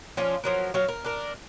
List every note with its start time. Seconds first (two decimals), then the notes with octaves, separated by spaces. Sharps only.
0.17 F3 C#4 D4 F4
0.44 F3 F#3 A#4
0.74 F#3 F5
0.88 A#4
1.05 D4 A#4